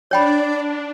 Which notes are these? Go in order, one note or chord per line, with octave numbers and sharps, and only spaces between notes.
D4 C#5 D5 G5 B5